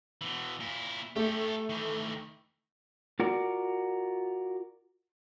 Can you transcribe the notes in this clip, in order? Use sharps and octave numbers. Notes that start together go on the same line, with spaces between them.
B2 E3
A#2 E4
A3 G4 A4
D#3 E3
F4 F#4 A#4 D5